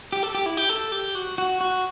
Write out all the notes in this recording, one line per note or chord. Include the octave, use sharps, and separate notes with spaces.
G4
A4
G4
E4
G4
A4
G4
F#4
F#4
F#4